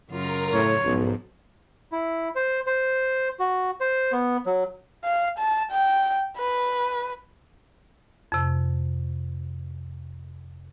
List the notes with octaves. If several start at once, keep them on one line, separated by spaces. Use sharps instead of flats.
F#2 C#3 F4 A#4 A#5
A2 C#5
B1 G#2 F3
E4
C5
C5
F#4
C5
B3
F#3
F5
A5
G5
B4
F2 C3